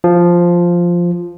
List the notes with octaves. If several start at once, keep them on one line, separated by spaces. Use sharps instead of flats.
F3